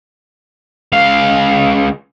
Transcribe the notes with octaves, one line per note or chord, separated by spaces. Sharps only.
C#2 F5